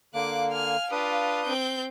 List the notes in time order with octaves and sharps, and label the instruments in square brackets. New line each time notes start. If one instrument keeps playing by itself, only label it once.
[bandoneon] D3 A#3 [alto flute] F5 [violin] D6 F#6
[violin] G#5 F6
[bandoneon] D4 B4 D#6 [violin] F4 G4
[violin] C4 G6